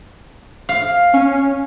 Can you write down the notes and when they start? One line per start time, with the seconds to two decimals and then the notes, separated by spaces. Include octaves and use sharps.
0.69 F5
1.13 C#4